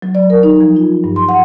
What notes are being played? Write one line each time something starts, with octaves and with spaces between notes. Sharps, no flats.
F#3
D5
A#4
D#4
F3
F4
G2
C6
F#5